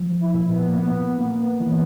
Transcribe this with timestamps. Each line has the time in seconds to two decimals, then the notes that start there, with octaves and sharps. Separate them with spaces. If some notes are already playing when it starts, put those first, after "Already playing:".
Already playing: F3
0.20 E4
0.34 A#2
0.48 B3
0.66 A#3
0.76 A#2 B3
1.18 A#3
1.60 E3